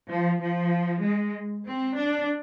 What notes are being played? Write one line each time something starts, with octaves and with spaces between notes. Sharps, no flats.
F3
F3
G#3
C4
D4